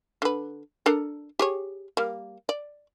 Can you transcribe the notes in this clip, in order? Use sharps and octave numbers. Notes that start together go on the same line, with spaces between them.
D3 B4
D4 A4 A#4
G4 G#4 C#5
G3 A#3
D5